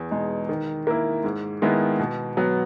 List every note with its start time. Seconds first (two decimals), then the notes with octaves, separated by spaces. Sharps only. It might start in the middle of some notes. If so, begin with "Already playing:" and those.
Already playing: E2
0.11 B2 G#3 D#4
0.49 D#3
0.87 A#3 E4
1.24 G#2
1.62 D#3 G#3 B3 E4
2.00 B2
2.37 F#3 B3